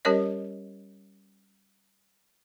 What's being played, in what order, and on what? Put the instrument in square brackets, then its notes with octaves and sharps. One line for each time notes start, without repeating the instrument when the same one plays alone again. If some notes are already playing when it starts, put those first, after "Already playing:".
[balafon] G3 C#4 G4 A#4 C#5 D#5